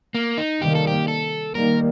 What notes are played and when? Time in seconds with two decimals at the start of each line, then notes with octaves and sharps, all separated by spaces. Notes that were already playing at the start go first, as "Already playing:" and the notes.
0.15 A#3
0.38 D#4
0.62 C3 D#3 G3 A#3 G4
0.75 A4
0.87 G4
1.08 A4
1.55 D#3 G3 A#3 A#4